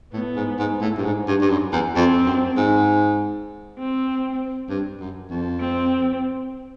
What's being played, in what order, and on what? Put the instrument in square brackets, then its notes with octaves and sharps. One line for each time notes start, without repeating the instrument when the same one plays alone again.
[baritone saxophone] A2 [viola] B3
[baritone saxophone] G#2
G#2
A2
G2
G#2
G2
G2
F#2
E2
[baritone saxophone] F2 [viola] C4
[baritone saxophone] F#2
G#2
[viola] C4
[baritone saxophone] G2
F#2
F2
[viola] C4